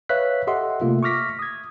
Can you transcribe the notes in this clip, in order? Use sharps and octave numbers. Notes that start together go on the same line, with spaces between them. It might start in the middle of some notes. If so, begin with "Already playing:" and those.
B4 C#5 E5 F5 F#6 B6
G4 A4 D#5 E5 F#5 C6
C3 A3 A#3 F4 E5
C#6 D6 F6 A#6 B6
D#6 G#6